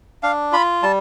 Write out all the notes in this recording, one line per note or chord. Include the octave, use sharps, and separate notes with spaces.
D4 F5
F4 B5
G3 A5